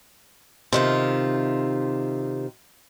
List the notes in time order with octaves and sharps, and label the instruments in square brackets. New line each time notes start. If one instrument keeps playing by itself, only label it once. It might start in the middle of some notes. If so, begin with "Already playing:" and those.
[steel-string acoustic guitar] C3 D#3 F4